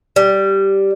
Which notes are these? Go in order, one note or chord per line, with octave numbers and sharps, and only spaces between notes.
G3